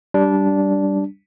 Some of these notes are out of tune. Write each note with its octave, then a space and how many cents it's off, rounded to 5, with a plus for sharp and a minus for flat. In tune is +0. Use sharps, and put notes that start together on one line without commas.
G3 -10 D4 -10